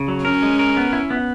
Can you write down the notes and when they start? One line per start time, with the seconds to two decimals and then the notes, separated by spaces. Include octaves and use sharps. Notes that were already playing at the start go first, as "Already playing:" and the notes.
Already playing: C#3
0.08 F#3
0.25 C#4 A#4
0.43 G#3
0.59 A#4
0.77 B3
0.93 E4
1.10 B3